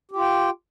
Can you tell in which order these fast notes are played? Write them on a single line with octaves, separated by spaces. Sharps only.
G4 F4 G5